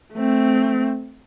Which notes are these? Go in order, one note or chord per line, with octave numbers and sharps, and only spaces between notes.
A3 C4